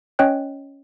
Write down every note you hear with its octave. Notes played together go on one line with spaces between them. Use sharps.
C#4 C#5 D#5 G5 F#6